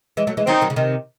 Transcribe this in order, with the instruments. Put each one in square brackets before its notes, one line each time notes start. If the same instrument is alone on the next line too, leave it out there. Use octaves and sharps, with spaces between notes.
[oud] E3 G#3
F#3 A3
E3 G#3
[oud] D#3 F#3 [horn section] C4 D#4
[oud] D#3 F#3
C#3
C3 D#3